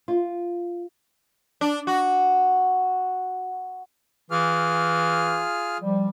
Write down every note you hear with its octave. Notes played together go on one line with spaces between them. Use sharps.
F4
D4
F#4
E3 F4 G#4 F6
F3 G3